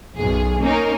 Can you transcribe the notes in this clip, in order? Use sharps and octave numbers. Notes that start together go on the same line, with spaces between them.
B1 F#2 G#4
A#3 C#4 D#4 A#4